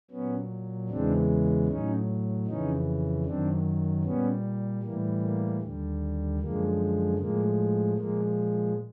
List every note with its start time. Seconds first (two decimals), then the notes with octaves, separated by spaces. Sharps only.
0.10 A#2 F#3 B3 C#4
0.89 E2 C#3 E3 G#3 C4 D4
1.68 A2 F#3 C#4 D#4
2.47 F2 C#3 E3 C#4 D#4
3.25 F#2 D#3 F#3 C4 D4
4.04 A#2 G3 B3 C#4
4.83 A2 E3 G3 A#3
5.22 A#3
5.61 D#2 D3 G3
6.40 F#2 D3 F3 G#3 A#3
7.18 A2 F3 G#3 A#3
7.97 A#2 F3 G#3 A#3